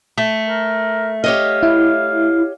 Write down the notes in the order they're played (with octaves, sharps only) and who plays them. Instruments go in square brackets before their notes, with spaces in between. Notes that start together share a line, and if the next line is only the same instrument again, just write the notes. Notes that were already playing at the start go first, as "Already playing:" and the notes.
[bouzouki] A3
[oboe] A#4
[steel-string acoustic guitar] G4 C#5 D#5 [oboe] F5
[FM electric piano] E4